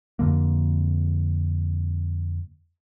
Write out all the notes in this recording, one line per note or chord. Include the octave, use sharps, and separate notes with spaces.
F2 D3 A#3